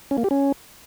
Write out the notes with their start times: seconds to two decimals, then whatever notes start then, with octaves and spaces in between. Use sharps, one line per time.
0.11 C#4
0.18 A#3
0.24 G4
0.31 C#4